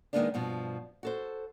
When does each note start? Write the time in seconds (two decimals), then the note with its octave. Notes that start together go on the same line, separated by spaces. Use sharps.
0.13 D#3 F3 G#3 A#3 B3 D4
0.34 G2 B2 F3
1.03 F#4 A4 C5